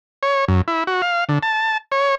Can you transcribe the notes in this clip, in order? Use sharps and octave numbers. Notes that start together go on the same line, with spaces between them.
C#5
F#2
E4
F#4
F5
D3
A5
C#5